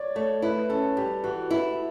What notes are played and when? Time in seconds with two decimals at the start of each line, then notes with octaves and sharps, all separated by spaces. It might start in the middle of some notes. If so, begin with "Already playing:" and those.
Already playing: C#5 D5
0.15 A3 C#5
0.42 E4 B4
0.69 C#4 A4
0.97 G3 G4
1.24 E3 F#4
1.51 E4